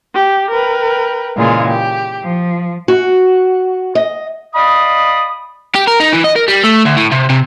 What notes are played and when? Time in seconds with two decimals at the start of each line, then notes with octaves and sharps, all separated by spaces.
0.14 G4
0.51 A#4 B4 G5
1.36 A#2 C#3 E3 G#3 F4
1.68 G4
2.23 F3
2.88 F#4
3.95 D#5
4.54 D5 D#5 F5 B5 D#6
5.75 G4
5.88 A#4
6.00 D#4
6.13 E3
6.24 D#5
6.36 A#4
6.48 G3
6.64 A3
6.85 D2
6.97 A2
7.11 C3
7.30 C3